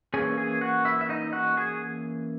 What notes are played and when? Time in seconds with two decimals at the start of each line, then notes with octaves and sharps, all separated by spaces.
0.14 E3 A#3 C#4 G#4 G#5
0.38 G#4 G#5
0.61 F#4 F#5
0.85 E4 E5
1.01 E5
1.09 D#4 D#5
1.33 F#4 F#5
1.57 G#4 G#5